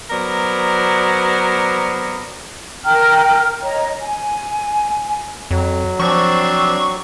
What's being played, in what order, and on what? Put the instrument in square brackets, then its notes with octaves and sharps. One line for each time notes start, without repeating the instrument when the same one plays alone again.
[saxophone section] F#3 B3 A#4 C5 D5
[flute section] A#4 G5 A#5 F6
C#5 D#5 A#5
G#5
[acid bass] F2 [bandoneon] F#3
[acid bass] F3 [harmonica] C4 D4 [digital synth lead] C#6